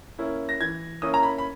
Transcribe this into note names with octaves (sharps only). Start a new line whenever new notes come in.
A#3 C#4 E4
A#6
E3 G#6
A#3 C#4 E4 D#6
A#5
B5
B5